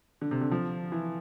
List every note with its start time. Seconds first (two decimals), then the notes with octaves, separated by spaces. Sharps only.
0.21 D3
0.31 C3
0.41 D3
0.51 F3
0.92 E3